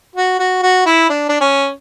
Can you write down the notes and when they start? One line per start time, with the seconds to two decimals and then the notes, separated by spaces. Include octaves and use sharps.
0.15 F#4
0.39 F#4
0.62 F#4
0.86 E4
1.09 D4
1.29 D4
1.41 C#4